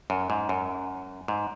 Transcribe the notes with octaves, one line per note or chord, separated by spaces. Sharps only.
F#2
G#2
F#2
G#2